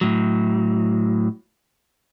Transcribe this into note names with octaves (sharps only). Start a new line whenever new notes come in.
A2 F#3